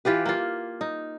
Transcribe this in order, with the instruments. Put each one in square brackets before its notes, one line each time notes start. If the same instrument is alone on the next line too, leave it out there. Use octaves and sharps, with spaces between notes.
[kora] E3 F4 G4 B4
A#3 F4
D#4